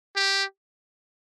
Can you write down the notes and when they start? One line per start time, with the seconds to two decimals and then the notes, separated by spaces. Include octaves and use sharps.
0.16 G4